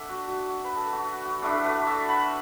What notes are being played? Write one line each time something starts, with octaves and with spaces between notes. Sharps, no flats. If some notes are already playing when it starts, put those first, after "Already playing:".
Already playing: A3 D4 E5 F#5
F#4
F#4
B4
A4
F#4
F#4
A2 A3 D4 A4
F#4 B4
E5 A5
F#5 B5